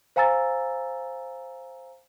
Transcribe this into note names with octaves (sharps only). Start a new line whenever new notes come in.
C5 F5 G#5 A#5 E6 A6